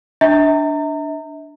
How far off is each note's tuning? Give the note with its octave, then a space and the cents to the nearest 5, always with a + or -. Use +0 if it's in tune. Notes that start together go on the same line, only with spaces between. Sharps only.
D4 +0 E5 -40 A#5 -30